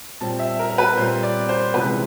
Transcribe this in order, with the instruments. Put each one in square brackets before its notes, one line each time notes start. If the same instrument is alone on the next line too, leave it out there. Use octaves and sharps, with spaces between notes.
[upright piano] A#2 G3 C4 A5
E5
A#4
A#4
B4
A#2 G3 C4 C5
D5
C5
C#2 C3 E3 G#3 B4